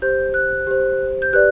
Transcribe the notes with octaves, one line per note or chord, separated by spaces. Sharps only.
G4 C5 G6
F#6
G4 C5
G6
G4 B4 D5 F#6